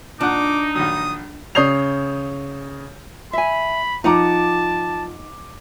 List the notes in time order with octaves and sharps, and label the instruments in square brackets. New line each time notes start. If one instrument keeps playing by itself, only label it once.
[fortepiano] A#2 F#5 [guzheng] D4 [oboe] D#4 [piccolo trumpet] D6
[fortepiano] A#1 D#3 F#3 [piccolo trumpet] D#6
[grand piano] C#3 C#5 D#6 G6 C7 F7
[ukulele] E5 G#5 [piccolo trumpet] B5
[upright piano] F3 D6 [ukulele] D#4 F#5 A#5 [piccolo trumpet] A5